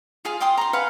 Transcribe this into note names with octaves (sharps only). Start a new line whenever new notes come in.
F4 G#4 F5
F5 G5 C6 D#6
A#5 C6
B4 F5 F#5 G#5